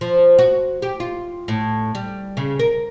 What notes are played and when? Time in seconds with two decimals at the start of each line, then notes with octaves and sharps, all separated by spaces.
0.01 F3
0.39 F#4
0.82 G4
1.00 F4
1.48 A2
1.95 G3
2.37 C#3
2.59 A#4